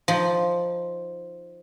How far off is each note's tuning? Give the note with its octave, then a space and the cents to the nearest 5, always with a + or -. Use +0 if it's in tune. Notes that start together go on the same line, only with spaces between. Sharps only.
F3 +0 D#4 +10